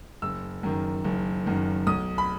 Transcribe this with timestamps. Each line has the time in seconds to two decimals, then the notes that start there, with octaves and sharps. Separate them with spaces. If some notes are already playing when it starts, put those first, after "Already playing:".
0.22 F#1 E6
0.63 F#2 D#3
1.04 F#1
1.46 F#2 D#3
1.87 B1 D#6
2.18 B5